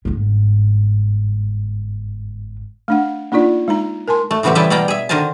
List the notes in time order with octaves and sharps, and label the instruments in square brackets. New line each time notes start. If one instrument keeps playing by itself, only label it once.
[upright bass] G1 G#2
[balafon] A3 D4 F#5
A#3 D4 D#4 F4 D5
G#3 D#4 A#5
A#4 G#5 A5 C6
[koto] A3
A2 C#3 E3 F#3 C4 G4
E3 G3 G#4 E5 G5 A5
B2 G3 D5 F5 G5 A#5
G#4 E5
D3 D#3 A#4 C5 G#5 A5